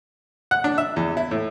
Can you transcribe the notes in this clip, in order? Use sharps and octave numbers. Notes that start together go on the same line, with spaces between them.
F#5
D4
E5
E2
E4
A2